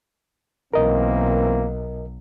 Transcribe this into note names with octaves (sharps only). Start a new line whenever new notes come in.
B1 E3 A#3 C4 A#4 D#5